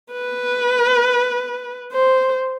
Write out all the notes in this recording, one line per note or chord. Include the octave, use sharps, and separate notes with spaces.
B4
C5